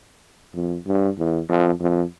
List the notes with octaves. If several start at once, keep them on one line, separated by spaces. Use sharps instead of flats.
F2
G2
E2
F2
F2